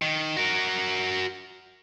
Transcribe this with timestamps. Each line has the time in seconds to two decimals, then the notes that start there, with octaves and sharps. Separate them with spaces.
0.02 D#3
0.37 F#4 A#4